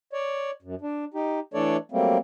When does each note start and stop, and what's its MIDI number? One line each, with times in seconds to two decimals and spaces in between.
0.13 0.51 73
0.13 0.51 74
0.63 0.75 42
0.81 1.05 62
1.14 1.39 63
1.14 1.39 67
1.54 1.77 52
1.54 1.77 57
1.54 1.77 62
1.54 1.77 69
1.54 1.77 73
1.54 1.77 74
1.92 2.18 54
1.92 2.18 55
1.92 2.18 57
1.92 2.18 58
1.92 2.18 60